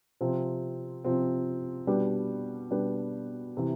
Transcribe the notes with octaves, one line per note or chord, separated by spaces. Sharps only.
C3 F3 C4
C3 F3 C4
B2 G3 D4 G4 B4
B2 G3 D4 G4 B4
C3 E3